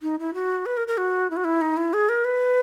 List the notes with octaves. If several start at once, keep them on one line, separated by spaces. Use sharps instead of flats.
D#4
E4
F#4
B4
A#4
A#4
F#4
E4
F#4
E4
D#4
E4
G#4
A#4
B4